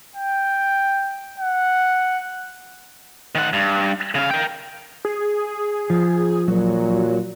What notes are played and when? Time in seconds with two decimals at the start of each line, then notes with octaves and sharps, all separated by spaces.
0.15 G5
1.40 F#5
3.35 D#3 F#5
3.53 G2
4.15 C#3 F5
4.31 A#4 G5
5.05 G#4
5.90 F3
6.48 A#2 F#3